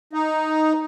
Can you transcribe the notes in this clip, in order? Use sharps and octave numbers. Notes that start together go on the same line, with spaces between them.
D#4